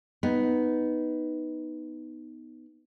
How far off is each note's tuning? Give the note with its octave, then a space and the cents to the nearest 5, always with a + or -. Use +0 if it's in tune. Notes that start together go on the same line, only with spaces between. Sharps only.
B3 +0 D#4 +0